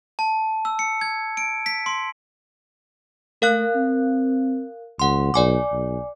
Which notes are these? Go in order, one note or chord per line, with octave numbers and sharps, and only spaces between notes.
A5
E6
C#7
G#6
D7
B6
C6
A3 A#4 F5 F#6
C4
C#2 F#5 C6
B1 D5 G#5 D6
B1